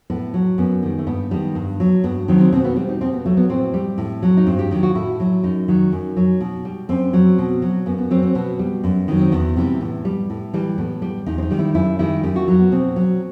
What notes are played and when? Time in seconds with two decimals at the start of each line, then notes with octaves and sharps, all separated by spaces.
0.10 A2 B3
0.34 F#3
0.58 F#2 B3
0.82 D#3 G3
0.99 A3
1.07 G2 B3
1.31 D#3 G3
1.55 G2
1.80 F#3
2.04 G2 B3
2.28 D#3 F#3 C4
2.41 C4
2.52 B2 C4
2.65 B3
2.76 G3 C4
2.89 D#4
3.01 B2 C4
3.13 B3
3.25 F#3 A3
3.37 B3
3.49 A2 C4
3.74 G3
3.98 A2
4.22 F#3
4.37 D#4
4.47 G2 C4
4.59 G4
4.71 D#3 F#3
4.83 F#4
4.95 A2 E4
5.20 F#3
5.43 F#2 D#4
5.68 D#3 F#3
5.92 F#2
6.16 F#3
6.40 B2
6.65 G3
6.89 F#2 C4
7.13 F#3
7.38 B2
7.62 F#3
7.86 F#2 B3
7.98 B3
8.11 F#3 C4
8.23 C4
8.35 B2 B3
8.59 G3
8.84 F#2
9.08 D#3 F#3
9.21 C4
9.32 E2 B3
9.56 C3 E3 G3
9.81 A2
10.05 G3
10.30 A2
10.54 E3 G3
10.78 A2 B3
11.02 G3
11.26 E2 D#4
11.38 C4
11.42 D#4
11.51 D#3 G3
11.59 E4
11.75 F#2 E4
11.99 D#3 G3 E4
12.23 F#2 G4
12.36 F#4
12.48 F#3 D#4
12.59 B3
12.72 B2 C4
12.96 F#3